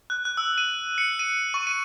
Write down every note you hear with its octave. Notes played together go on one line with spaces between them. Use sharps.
F#6
F#6
E6
D#7
C#7
D#7
C#6
D#7